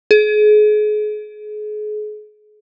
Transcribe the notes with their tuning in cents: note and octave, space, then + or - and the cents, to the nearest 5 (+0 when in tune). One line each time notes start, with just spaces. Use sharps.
G#4 +35